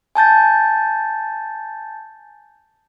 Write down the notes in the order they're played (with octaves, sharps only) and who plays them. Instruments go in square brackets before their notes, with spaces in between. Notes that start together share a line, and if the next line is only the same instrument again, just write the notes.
[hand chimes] G#5 A5 G6 A6